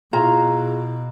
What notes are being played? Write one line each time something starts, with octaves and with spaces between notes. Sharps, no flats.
B2 E4 F4 G#4 A#5